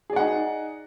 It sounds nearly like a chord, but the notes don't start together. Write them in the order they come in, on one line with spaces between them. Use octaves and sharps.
G#4 D5 F#5 D#4